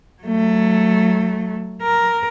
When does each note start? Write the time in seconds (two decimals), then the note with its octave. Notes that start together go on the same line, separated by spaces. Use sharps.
0.23 F#3 A3
1.82 A#4